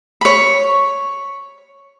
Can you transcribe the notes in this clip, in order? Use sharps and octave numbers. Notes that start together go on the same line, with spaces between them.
C#5 B5